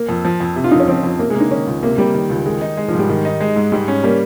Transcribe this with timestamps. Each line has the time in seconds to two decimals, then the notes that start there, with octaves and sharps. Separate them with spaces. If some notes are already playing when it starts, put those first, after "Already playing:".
Already playing: A#3
0.09 F2
0.25 F3
0.40 F2
0.56 C3
0.64 F4
0.71 F2 D#4
0.80 C#4
0.88 F3 C4
1.03 F2
1.19 C3 A#3
1.30 G#3
1.35 A#3
1.40 D#4
1.51 D#3 C#4
1.67 C#2
1.82 C3 A#3
1.98 G3 A#3
2.14 D#3
2.30 C#2
2.45 D#3 G#3
2.61 D#4
2.77 G#3
2.88 F3
2.93 G#2
2.99 G3
3.09 D#3
3.25 D#4
3.41 G#3
3.56 G#2
3.72 G#2 G3
3.88 C#4
4.04 G3 A#3